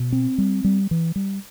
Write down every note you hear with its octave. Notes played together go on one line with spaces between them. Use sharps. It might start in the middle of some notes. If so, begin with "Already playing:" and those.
Already playing: B2
C4
G3
G3
E3
G3